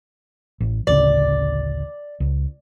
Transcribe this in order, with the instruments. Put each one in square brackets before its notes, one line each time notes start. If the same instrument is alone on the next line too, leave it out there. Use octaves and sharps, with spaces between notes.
[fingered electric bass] A1
[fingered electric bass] A1 D2 C#3 [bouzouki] D5
[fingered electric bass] C#2